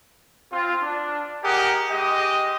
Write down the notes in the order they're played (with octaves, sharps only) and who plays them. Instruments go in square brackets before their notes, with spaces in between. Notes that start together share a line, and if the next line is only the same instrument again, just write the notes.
[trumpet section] C4 F4
D4
G4 G#4 A#4 D#5 F#5
G#3 G4 D#5